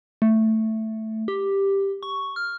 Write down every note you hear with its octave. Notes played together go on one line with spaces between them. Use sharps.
A3
G4
C#6
F6